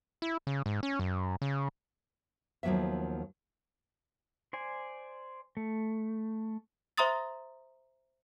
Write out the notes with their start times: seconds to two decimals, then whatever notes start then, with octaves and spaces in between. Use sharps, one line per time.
0.22 E4
0.47 C#3
0.66 G#2
0.83 C#4
0.99 F#2
1.42 C#3
2.63 D#2 F3 F#3 B3 E5
4.53 C5 D5 G#5
5.57 A3
6.98 C5 E5 A#5 C6 D#6 A6